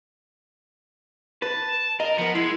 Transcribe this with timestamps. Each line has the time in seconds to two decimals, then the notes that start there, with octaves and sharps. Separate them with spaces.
1.42 B4 A5
2.00 A#4 D#5
2.18 F3 B3 A#4
2.35 G#3 E4